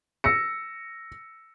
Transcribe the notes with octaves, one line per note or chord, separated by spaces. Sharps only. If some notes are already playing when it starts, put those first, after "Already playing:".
E6 A#6 C#7